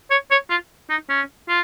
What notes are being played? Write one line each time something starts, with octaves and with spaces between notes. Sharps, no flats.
C#5
C#5
F4
D#4
C#4
F4